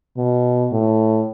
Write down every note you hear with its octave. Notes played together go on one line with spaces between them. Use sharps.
B2
A2